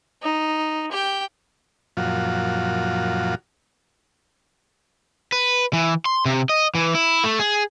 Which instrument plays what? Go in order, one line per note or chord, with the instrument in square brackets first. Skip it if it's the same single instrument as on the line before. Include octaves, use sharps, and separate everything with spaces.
[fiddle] D#4
G4 G5
[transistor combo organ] F#2 A#2 F3 F4 F#4
[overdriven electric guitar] B4
E3
C6
C3
D#5
E3
E4
A3
G#4